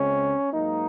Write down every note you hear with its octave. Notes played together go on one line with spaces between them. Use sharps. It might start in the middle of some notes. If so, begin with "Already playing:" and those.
Already playing: C#2 C#3 G#3 C4 C#4
G#2 F#3 A#3 D#4